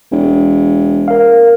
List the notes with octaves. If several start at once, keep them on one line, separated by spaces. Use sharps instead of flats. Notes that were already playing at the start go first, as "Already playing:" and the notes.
E1
A#4 F5